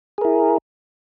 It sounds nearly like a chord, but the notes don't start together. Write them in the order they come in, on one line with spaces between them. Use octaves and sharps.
G#4 A#4 E4